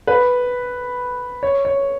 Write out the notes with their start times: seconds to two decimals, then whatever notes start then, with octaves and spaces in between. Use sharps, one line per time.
0.07 B4
1.43 C#5
1.65 C#5